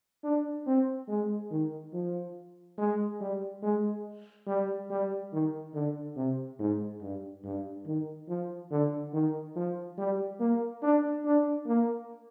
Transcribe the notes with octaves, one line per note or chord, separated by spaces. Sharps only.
D4
C4
G#3
D#3
F3
G#3
G3
G#3
G3
G3
D#3
D3
C3
G#2
G2
G2
D#3
F3
D3
D#3
F3
G3
A#3
D4
D4
A#3